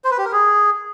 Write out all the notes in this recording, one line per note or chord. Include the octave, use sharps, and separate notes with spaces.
C5
B4
G4
A#4
G#4